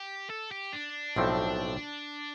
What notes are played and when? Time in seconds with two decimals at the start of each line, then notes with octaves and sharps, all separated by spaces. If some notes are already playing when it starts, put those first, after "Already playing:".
Already playing: G4
0.30 A4
0.51 G4
0.73 D4
1.16 B1 A2 F3 A3 C4